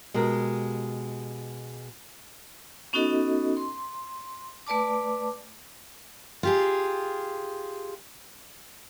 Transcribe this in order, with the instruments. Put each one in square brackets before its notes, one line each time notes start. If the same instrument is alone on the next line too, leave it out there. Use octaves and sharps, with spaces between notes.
[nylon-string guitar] B2 G#3 G4 A#4
[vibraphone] B3 C#4 D#4 F#4 A4 D#5
C6
A3 B4 D5 A5 D6
[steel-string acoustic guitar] F4 G4 G#4